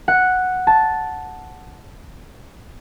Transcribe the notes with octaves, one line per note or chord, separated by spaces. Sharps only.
F#5
A5